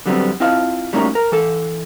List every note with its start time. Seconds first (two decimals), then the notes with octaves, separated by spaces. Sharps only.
0.06 D3 F#3 G3 B3 C4
0.40 C4 E4 F4 D#5 F5 A5
0.93 G3 A3 A#3 C#4 D#4
1.15 A#4
1.32 E3 A4